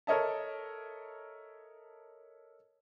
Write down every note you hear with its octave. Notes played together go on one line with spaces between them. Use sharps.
A4 A#4 C#5 D#5 E5 A5